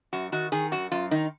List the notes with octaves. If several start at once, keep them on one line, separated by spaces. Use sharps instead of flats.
F#2 F#4
D#3 F#4
D#3 G#4
F#2 F#4
F#2 F4
D#3 D#4